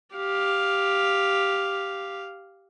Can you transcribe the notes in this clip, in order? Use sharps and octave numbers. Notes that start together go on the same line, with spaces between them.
G4 F5